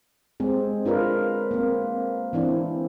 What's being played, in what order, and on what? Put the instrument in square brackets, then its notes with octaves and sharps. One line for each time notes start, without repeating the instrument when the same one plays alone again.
[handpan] G#3 C4 G#4
D4 F4 A#4 B4
A#3 C4
E3 C4 D4 E4